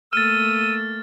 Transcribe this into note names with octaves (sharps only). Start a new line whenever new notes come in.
A3 A#3 E6 F6 A6 D#7